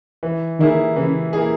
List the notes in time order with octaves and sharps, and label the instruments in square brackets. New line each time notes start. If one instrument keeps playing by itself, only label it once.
[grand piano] E3
[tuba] D#3 [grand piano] A#3 E4 G#4
[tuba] C#3 [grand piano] E3
[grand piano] A#3 E4 G#4